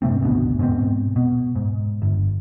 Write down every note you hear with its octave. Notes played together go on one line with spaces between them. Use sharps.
G2 C3 A3 C4
G#1 D2 B2
G#2 B2 D#3 C4
B2
G#2
G1